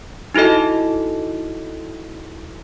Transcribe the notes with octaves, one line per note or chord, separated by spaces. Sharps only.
D#4 E4 F#4 A4 D#5